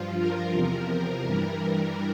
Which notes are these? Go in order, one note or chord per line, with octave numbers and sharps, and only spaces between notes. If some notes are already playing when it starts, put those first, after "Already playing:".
Already playing: G2 F3 F4
A#4
E2 C3 F3
G2 E3 G3